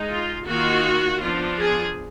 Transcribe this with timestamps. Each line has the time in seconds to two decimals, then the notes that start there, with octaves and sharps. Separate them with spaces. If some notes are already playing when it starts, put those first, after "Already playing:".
Already playing: G#3 D#4
0.09 F4
0.46 D#3 A#3 F4 F#4
1.21 F3 B3 D4 F4
1.59 G#4